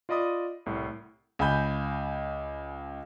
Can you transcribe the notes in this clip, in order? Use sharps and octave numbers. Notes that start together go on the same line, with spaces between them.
F4 D5 D#5 B5 D#6
C2 A2
C#2 G#5 B5 G6